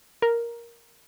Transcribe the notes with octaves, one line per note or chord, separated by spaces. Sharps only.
A#4